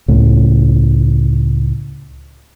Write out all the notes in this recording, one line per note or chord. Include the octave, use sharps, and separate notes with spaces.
C#2 A2